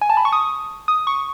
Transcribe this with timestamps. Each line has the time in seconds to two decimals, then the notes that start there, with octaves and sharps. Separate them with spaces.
0.01 G#5
0.10 A5
0.17 B5
0.25 C#6
0.33 D#6
0.88 D#6
1.07 C#6